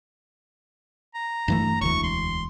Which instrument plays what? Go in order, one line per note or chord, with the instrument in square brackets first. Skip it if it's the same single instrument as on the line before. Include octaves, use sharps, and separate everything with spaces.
[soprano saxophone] A#5
[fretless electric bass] G2 E3 A3
[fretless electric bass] E1 D2 E3 [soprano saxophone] C#6
[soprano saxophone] C6